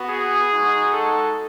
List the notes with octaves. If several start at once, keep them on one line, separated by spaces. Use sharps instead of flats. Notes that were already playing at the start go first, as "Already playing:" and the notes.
Already playing: B3 F#4
G#4
G#3 D#4 F#4
A4